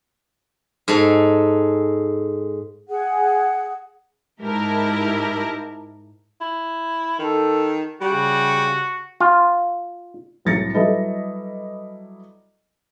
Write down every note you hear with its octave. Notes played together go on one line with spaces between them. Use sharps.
G#2 A4
G#4 F#5
G#2 E4 G4 A#4 A5
E4
D#3 A4
C#3 G3 F#4
F4
C2 A2 F#3 A6 A#6 C#7
F#3 G3 E4 A4 B4 D#5